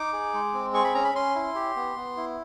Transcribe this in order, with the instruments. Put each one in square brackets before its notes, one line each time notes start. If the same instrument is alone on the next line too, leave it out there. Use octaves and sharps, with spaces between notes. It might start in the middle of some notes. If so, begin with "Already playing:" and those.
Already playing: [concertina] D#4 D6
G#4
G#3
C4
G#4 C#6
B5
C#4 A#5
B5
C#4 C6
E4
G4
B3
B3
E4